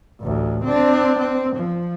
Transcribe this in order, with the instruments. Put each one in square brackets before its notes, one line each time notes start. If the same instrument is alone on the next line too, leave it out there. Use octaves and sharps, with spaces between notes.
[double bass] A1 D2
C4 D4
C4
F3